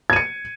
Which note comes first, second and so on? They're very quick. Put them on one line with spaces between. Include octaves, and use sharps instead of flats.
G#6 D#7 C#7